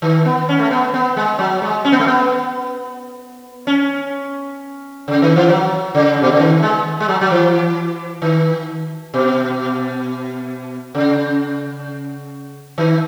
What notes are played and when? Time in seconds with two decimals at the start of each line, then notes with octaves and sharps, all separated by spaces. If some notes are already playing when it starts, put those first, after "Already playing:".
0.02 D#3
0.25 B3
0.49 C#4
0.59 A3
0.71 B3
0.94 B3
1.17 G#3
1.39 F#3
1.62 G#3
1.85 C#4
1.92 B3
2.00 A3
2.07 B3
3.67 C#4
5.08 C#3
5.22 D#3
5.36 E3
5.49 F#3
5.95 C#3
6.22 B2
6.32 C#3
6.40 D#3
6.63 G#3
7.00 G#3
7.08 F#3
7.21 F#3
7.30 E3
8.22 D#3
9.14 B2
10.95 C#3
12.78 D#3